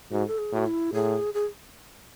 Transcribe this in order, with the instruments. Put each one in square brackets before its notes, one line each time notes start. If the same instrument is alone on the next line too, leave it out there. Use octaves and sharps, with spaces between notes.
[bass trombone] G#2 [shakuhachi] F#4
[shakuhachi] A4
G#4
[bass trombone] A2 [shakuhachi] F#4
[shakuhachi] E4
[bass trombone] A2 [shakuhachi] G#4
[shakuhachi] G#4